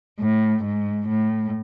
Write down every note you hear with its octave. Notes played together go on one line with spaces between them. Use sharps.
A2
G#2
A2